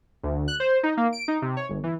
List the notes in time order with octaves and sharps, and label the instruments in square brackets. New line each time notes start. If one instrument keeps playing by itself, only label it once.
[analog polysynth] D2
F#6
C5
D#4
A#3
D7
D#4
C3
C#5
G1
E3